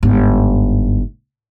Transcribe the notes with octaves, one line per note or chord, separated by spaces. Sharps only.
G1 G#2